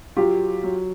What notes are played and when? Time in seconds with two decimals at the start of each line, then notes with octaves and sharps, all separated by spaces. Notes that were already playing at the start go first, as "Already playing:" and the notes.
0.17 F#3 F4 G4
0.64 F#3